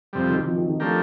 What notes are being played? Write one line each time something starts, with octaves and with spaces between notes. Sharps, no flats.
F2 C3 G3
D#3
F3
D#3
D#3
F3 A3 D4 G4 A#4